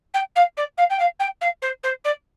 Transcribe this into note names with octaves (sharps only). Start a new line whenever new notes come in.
G5
F5
D5
F5
G5
F5
G5
F5
C5
C5
D5